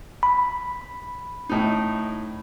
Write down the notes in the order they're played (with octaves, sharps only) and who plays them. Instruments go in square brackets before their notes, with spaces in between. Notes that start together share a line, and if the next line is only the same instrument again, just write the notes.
[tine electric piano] B5
[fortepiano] A2 D#4